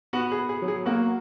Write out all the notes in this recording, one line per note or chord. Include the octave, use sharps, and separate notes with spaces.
B3 F#4
G#4
B3
G#4
F#3
G#4
A#3 F#4